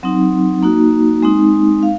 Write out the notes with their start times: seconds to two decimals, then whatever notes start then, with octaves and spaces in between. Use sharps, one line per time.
0.03 F#3 C4 D#4
0.63 A#3 D#4 F#4
1.22 G#3 C4 D#4
1.83 F5